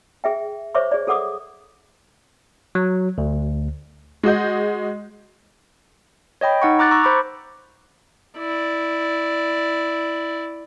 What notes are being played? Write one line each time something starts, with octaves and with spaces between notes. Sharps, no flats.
G#4 E5 G5
C5 C#5 E5 C#6 D6
G#4 D5
G#4 A4 F#5 D6 D#6
F#3
D2
G#3 F#4 D#5 G6
C#5 D#5 G5 B5
D#4 F#5 C#6
A#5 D6 F#6 A6
A#5 C#6 E6
C5 B5 D6
E4 D5